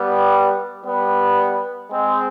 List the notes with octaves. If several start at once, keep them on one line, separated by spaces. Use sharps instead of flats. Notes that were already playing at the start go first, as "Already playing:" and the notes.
Already playing: G3 B3
G3 B3
G#3 C4